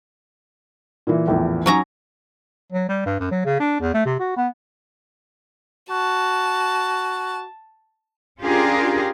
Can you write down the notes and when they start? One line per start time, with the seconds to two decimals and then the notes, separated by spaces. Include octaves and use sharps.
1.07 A#2 E3
1.28 A#1 E2 A2
1.66 F#3 C#4 D#4 A#5
2.72 F#3
2.88 G3
3.06 G2
3.20 F#2
3.31 F#3
3.45 C#3
3.59 D4
3.80 E2
3.94 A3
4.05 C3
4.19 F#4
4.37 B3
5.90 F#4 A5
8.41 C#4 D4 F4 G4 G#4 A#4